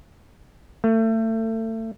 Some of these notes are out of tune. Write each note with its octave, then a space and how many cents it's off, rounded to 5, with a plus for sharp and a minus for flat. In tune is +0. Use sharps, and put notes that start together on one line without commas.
A3 +30